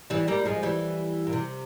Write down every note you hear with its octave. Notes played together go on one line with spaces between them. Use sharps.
E3 G3
G3 A#3
F3 G#3
E3 G3
A#2
C3